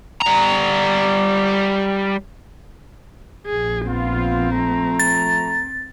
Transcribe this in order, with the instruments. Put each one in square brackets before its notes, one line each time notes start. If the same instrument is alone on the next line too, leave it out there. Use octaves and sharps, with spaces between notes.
[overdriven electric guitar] G3 A#5
[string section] A#1 [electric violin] G#4
[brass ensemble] F3 B3 F4 [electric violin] C4
[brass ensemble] F3 A3 A#5
[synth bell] A6